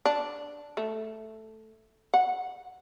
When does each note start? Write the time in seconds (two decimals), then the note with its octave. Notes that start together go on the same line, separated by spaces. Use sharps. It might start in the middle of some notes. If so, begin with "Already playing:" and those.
0.05 D4
0.77 A3
2.14 F#5